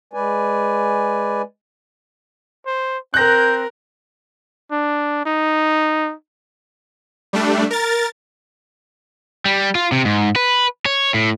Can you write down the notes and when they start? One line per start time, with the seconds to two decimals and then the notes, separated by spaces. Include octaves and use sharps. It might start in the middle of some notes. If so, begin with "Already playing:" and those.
0.13 G#3 B4 D5 G#5
2.66 C5
3.14 C4 A#4 F#6 G6 A#6
4.71 D4
5.26 D#4
7.33 G3 A3 D4
7.70 A#4 A6
9.45 G3
9.75 F4
9.92 C3
10.05 G#2
10.36 B4
10.86 C#5
11.14 A2